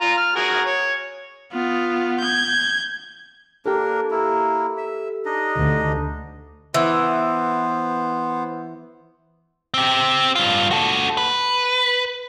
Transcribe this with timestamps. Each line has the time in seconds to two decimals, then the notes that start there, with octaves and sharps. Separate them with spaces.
0.01 F4 A#5
0.18 F6
0.36 F#4 G#4 A#4
0.67 C#5
1.53 B3 F4
2.20 G6 G#6
3.66 A#3 D4 G4 A4 A#4
4.11 A#3 E4
4.78 E5
5.25 D4 D#4 D#5
5.56 D2
6.74 E3 B3 C5
9.74 C4 G4
10.35 G2 F4
10.71 F#4 A4
11.17 B4